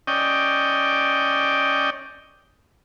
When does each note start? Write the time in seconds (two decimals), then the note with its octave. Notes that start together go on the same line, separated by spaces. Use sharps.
0.07 C#4 D5 D#5 G5